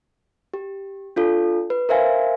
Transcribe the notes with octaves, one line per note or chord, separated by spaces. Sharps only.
G4
D4 F4 A4
B4
A#4 C5 E5 F5 G#5